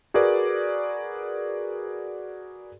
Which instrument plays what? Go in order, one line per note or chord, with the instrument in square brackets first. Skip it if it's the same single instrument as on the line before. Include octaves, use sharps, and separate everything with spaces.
[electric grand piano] F#4 G#4 A#4 B4 D5